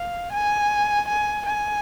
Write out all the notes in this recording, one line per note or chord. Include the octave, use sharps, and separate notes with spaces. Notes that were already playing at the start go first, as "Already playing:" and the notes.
Already playing: F5
G#5
G#5
G#5